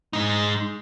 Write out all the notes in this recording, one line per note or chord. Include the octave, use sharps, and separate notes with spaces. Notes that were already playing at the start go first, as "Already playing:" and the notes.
G#3 D#4